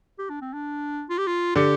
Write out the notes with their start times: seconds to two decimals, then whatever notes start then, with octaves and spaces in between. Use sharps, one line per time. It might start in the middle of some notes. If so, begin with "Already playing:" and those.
0.19 G4
0.30 D4
0.41 C4
0.53 D4
1.10 F4
1.18 G4
1.27 F4
1.55 D3 G4